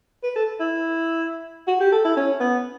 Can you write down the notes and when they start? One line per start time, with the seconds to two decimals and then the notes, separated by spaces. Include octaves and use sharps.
0.23 B4
0.36 A4
0.60 E4
1.67 F#4
1.80 G4
1.92 A4
2.04 E4
2.16 C#4
2.40 B3